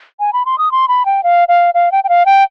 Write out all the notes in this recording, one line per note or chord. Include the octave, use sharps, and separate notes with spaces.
G#5
B5
C6
D#6
C6
B5
G5
F5
F5
F5
G5
G5
F5
G5